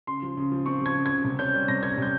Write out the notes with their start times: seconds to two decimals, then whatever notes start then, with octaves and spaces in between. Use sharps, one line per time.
0.07 C#3 C6
0.22 F3
0.37 C#3
0.52 F3
0.66 C4 C#6
0.81 F3 G#6
0.95 C#3
1.06 C#3 G#6
1.24 C3
1.39 C#4 G6
1.54 G3
1.68 C3 A#6
1.83 C#4 G#6
1.97 C3 G6